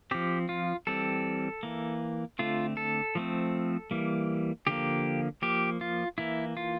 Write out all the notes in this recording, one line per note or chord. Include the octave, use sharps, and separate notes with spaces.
F3 C4 G4
F4
E3 G3 C4 A4
E3 A#3
D3 A3 C4 F4
A4
F3 A3 C4
E3 G3 A#3
D3 F3 A#3 G4
F3 A#3 G4
F4
E3 A#3 E4
F4